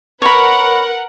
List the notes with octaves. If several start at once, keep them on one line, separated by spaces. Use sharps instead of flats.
A#4 B4 C#5 F#5 B5